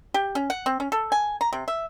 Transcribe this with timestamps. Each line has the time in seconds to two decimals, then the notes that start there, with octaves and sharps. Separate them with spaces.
0.14 G4
0.35 C#4
0.50 F#5
0.66 C4
0.80 C#4
0.92 A4
1.12 G#5
1.41 A#5
1.53 C3
1.68 E5